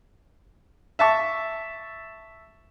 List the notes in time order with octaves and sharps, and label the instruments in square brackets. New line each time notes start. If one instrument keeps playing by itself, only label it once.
[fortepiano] E5 A5 C#6